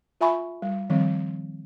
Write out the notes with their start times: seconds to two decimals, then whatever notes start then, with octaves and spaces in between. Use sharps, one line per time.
0.21 F4 E5 G#5 B5 C#6
0.62 G3
0.90 D#3 F3 G3 C4